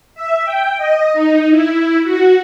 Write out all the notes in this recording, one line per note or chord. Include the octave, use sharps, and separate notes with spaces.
E5
G5
D#5
D#4
E4
F#4